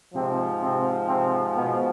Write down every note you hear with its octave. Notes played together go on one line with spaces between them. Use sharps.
G#2 C3 F3 C4
C3 C4
C3 C4
B2 B3